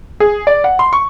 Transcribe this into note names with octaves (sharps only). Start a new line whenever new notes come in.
G#4
D5
F#5
C6
C#6